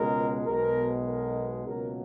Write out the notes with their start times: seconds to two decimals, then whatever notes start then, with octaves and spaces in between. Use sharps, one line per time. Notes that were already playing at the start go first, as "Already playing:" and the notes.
Already playing: C#2 B2 G#3 A#4
0.45 B1 B2 G#3 A#4
1.06 A#4
1.66 C#2 B2 F#3 A#3 A#4